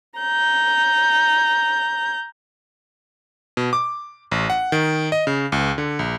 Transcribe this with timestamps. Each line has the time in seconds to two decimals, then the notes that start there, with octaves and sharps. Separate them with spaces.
0.20 A#5 G6
3.57 B2
3.73 D6
4.31 A1
4.50 F#5
4.72 D#3
5.12 D#5
5.27 C#3
5.52 C#2
5.78 D3
5.99 A#1